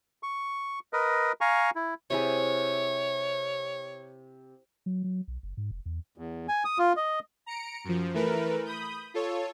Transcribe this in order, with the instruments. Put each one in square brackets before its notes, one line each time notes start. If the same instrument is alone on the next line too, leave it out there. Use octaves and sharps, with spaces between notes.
[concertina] C#6
A#4 B4 D#5
F5 G#5 A#5 C#6
E4
[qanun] C3 E4 G#4 [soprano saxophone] C#5
[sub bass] F#3
F#3
B1
F#1
G#2
F1
E2
[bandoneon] E2
G#5
D#6
F4
D#5
[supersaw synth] A#5 C#7 D7
F#2 F3
E3 A3 A#4 B4
B5 D#6 G6
F4 A4 C#5